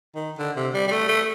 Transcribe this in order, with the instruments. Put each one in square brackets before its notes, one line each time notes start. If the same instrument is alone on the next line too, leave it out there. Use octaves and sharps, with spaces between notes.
[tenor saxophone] D#3
D3
C3
G3
G3
A3
A3